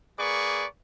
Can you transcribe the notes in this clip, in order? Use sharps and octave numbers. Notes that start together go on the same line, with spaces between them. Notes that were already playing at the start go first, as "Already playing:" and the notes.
A#3 G#4 B4 D5 C#6